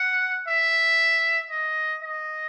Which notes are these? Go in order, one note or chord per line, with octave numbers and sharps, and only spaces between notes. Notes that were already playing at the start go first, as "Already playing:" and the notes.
Already playing: F#5
E5
D#5
D#5